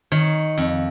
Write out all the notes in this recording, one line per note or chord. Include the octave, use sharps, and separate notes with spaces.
D#3 C#5
F2